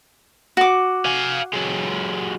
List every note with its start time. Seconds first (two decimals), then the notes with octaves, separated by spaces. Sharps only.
0.57 F#4 D6
1.06 F5 G#5
1.53 F#3 G#3